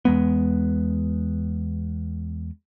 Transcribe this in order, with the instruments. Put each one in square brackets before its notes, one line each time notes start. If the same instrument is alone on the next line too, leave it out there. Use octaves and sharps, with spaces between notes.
[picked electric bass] E2 G#3 B3